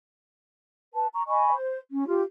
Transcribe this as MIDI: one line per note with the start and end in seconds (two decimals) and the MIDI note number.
0.94 1.06 71
0.94 1.06 81
1.14 1.22 82
1.14 1.22 85
1.27 1.53 75
1.27 1.53 80
1.27 1.53 83
1.27 1.53 85
1.53 1.78 72
1.91 2.06 61
2.07 2.21 65
2.07 2.21 67